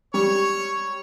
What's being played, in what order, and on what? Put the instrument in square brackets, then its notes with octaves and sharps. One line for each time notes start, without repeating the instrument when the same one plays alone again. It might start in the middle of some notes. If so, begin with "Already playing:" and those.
[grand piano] G3 [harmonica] C#5